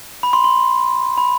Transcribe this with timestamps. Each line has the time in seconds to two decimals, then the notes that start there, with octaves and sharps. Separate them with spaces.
0.23 B5
0.33 C6
0.44 C6
1.18 B5